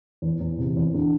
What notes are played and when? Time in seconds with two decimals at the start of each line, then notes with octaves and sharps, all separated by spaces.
0.22 E2
0.40 E2
0.58 C3
0.76 E2
0.94 D3